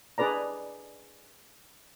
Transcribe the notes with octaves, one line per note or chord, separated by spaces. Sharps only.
D4 G#4 B4 D5 A#5